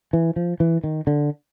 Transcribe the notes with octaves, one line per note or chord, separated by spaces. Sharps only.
E3
F3
E3
D#3
D3